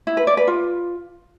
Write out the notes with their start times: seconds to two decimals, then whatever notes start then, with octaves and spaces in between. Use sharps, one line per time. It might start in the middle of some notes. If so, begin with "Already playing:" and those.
0.07 E4
0.17 B4
0.27 D5
0.37 B4
0.47 F4